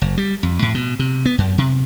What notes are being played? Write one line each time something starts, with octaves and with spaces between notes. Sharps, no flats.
F#1
G3
F2
A2
B2
C3
B3
F#2
C3